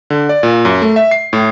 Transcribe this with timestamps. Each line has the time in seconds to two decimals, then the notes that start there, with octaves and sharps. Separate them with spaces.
0.10 D3
0.29 D5
0.43 A#2
0.65 F#2
0.82 A3
0.96 E5
1.11 C7
1.33 A2